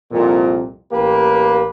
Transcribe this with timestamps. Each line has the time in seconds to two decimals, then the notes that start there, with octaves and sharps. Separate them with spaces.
0.11 C2 F2 A#2
0.91 A1 A#3 G4 B4